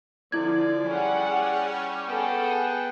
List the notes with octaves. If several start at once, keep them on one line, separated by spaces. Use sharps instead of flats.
D3 F3 E4 D5 G#6
G3 C#4 G#4 F#5
B3 G#4 A4 F#5 G5